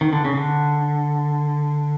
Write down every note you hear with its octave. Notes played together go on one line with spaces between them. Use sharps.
D#3
D3
C#3
D3